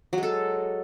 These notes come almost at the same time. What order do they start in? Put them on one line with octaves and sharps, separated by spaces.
F#3 G#3 A4